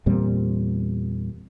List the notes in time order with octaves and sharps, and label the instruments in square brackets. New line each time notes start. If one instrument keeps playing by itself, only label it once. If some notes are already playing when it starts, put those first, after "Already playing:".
[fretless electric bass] E2 A#2 G3 C4